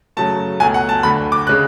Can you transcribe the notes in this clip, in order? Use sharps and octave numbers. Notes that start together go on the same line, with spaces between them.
F#2 C#3 F#3 A3 A5
C#2 B2 F#3 A3 G#5
F#5
A5
D2 D3 A3 B5
D6
C#3 G#3 F#6